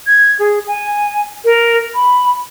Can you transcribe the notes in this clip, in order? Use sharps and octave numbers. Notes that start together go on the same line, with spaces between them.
G#6
G#4
G#5
A#4
B5